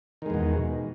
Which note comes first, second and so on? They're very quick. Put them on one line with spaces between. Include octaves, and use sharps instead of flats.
D#3 G#3 E2 B2